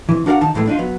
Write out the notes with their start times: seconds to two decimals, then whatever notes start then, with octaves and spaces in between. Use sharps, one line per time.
0.09 C3 E3
0.26 D4 F#4 A#4 F5 F#5
0.41 D#3 D#4 A5
0.54 C2 A2 E3 G#3 A3
0.67 D4 D#4 F4
0.79 F#3 B3